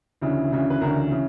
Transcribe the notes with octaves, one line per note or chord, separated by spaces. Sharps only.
D2 C#3 E3 E4
E4
D2 C#3 E3
B4
D2 C#3 E3 A#4
C#3 E3